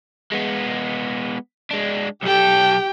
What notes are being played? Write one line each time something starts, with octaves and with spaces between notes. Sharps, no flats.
G#3 B3
G#3 D4
B1 G4 A4 G5